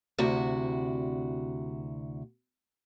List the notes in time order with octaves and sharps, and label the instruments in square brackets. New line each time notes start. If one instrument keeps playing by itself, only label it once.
[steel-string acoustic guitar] D2 C3 E4 F#4